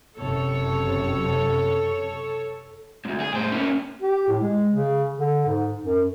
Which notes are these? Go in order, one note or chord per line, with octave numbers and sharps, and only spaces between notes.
F#1 F#2 C3 A4 C#5
D2 G#2
G#4
A2 C5
A#3 C#4
G4
A2
G#3
C#3
D3
G#2
F#2